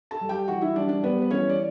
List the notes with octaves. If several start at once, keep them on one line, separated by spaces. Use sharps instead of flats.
A4 A5
G3
G4 G5
E3 F#4 F#5
E4 E5
G3 D4 D5
D4 D5
G3 B3 B4
B4
E3 C#4 C#5
D5